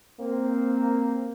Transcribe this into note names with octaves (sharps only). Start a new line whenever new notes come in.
A#3 C4